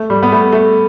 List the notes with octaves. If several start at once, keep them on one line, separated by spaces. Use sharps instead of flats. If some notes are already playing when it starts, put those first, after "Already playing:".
Already playing: A3
G3
B3
A3
A3